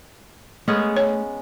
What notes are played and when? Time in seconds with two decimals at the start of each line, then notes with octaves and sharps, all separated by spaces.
0.68 G#3 A3 B3 C#4
0.97 C#5